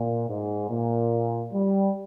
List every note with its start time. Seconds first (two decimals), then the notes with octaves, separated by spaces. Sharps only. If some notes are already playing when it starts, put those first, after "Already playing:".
Already playing: A#2
0.29 G#2
0.70 A#2
1.54 G3